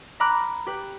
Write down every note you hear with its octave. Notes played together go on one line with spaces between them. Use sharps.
A#5 B5 D6 F6 F#6
G4 B4